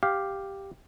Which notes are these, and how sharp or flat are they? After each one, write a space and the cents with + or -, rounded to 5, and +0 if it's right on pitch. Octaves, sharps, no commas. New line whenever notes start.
G4 +0 F5 +0